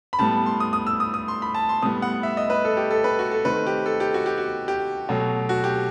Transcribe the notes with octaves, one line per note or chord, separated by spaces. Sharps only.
B5
A2 G3 B3 A5
C6
D#6
D#6
E6
D#6
D#6
C6
B5
A5
C6
A2 G3 B3 D#6
F#5
E5
D#5
B4
A4
G4
A4
B4
F#4
A4
D#3 A3 C4 B4
G4
A4
G4
F#4
G4
F#4
G4
B2 F#3 A3
F#4
G4